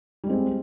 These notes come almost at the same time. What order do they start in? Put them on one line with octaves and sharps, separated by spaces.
G3 G#3 C4 G#4